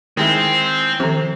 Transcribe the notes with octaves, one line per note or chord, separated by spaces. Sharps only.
D#3 G#3 C4 E4
C3 D#3 F3